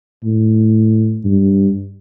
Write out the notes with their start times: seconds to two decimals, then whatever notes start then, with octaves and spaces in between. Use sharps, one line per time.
0.24 A2
1.24 G2